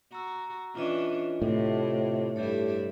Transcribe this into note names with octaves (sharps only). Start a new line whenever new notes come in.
F#4 A#5 E6
E3 C#4 D4 F4 D#5
A2 C3
G2 E4 G4 A4 C#5